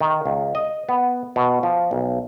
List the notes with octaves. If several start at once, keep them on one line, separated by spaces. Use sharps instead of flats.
D#3
C#2
D#5
B3
B2
F3
B1